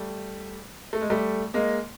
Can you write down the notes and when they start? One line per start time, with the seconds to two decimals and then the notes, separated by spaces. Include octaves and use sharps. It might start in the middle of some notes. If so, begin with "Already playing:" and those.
Already playing: G3 A3
0.93 A3
1.01 G#3
1.10 G3 A3
1.54 G#3 A#3